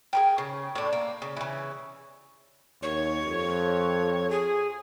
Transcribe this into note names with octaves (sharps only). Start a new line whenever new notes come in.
G#4 A#4 G5
C#3
A2 D4
A#3
C#3
C#3 E3
D#2 C#5
F2
G#4